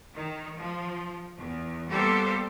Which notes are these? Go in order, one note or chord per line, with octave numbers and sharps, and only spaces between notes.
D#3
F3
E2
G3 A#3 B3 G4 A4 C5